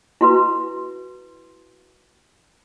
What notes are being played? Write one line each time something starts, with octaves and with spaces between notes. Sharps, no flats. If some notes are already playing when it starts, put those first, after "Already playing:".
E4 F#4 B4